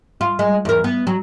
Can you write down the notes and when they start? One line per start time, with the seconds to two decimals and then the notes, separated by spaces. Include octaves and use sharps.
0.21 F4
0.39 G#3
0.65 E2 A#4
0.84 B3
1.07 F#3